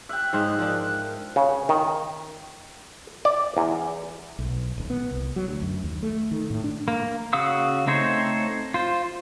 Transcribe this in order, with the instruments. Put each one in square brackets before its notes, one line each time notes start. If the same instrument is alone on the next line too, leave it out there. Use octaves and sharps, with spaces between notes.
[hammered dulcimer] E5 G5 [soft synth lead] F#6
[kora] G#2 C5 F5 [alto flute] G#3
[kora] F3 D4 [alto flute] A#4
[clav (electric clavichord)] C#3
D#3
D5
E2
[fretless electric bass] B1
D#1
B3
C2
F#3
D2
F#2
D#2
A3
D#3
A2
D4
[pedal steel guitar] A#3
C#3 F#4 F5 D#6 E6
A3 C4 D#4 C5 C#5
F4 C5